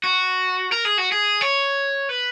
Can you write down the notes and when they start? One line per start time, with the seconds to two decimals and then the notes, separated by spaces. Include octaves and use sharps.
0.04 F#4
0.72 A#4
0.85 G#4
0.98 F#4
1.12 G#4
1.41 C#5
2.09 B4